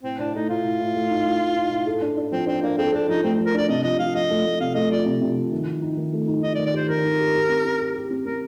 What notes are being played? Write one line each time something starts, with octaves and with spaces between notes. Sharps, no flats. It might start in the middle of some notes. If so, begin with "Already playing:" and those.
A2 C4
A2 D4
A3 D#4
A2 F4
A2
A2
A3
D#4
A2
A2
D#4
A2
A4
D4
D4
F3 C4
C4 D4
A#3 D4
C4 A4
D4 A4
F3 D#4
A3 C4
F3
A#4
D4 D5
C3 D#5
F3 D#5
F3 F5
F3 D#5
A3
A3
C3 F5
A3 D#5
F3 D5
C3
C3
F3
D#3
D#4
D#4
D#3
A3
D#4
D#4 D#5
D5
D#3
D5
G4 C5
D#3 A#4
D#4
G4
G4
C4
C4
G4
G4
C4
C4 A#4